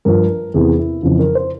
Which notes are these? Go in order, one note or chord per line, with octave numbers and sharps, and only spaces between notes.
G2 F3 A#4
E2 C3 E3 G#4
E4
F2 C#3 E3 F4
A#4
C5